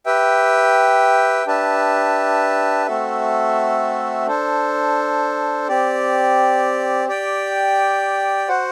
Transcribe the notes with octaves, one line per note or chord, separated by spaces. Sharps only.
G4 B4 E5 G5
D4 G4 B4 E5 A5
A3 C4 F#4 A4 E5
D4 A4 C5
C4 G4 D5
G4 D5 G5
F#4 C5 F#5